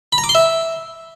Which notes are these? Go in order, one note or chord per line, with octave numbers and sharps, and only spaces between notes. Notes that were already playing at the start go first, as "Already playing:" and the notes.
B5
A#5
D6
C6
E5